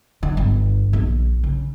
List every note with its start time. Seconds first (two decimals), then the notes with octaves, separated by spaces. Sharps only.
0.23 D3
0.37 G1
0.93 A#1
1.44 C#3